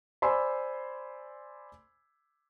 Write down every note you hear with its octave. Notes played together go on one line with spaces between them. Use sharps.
C5 D5 G#5 B5 C6 E6